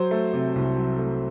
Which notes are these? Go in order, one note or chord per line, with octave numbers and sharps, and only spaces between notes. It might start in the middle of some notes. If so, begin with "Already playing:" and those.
Already playing: F#3 C5
A3
C3
C2
F#3
A3